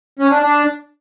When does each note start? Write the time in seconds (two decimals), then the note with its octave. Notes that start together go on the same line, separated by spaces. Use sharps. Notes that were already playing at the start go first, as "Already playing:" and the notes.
0.19 C#4
0.31 D4
0.42 D4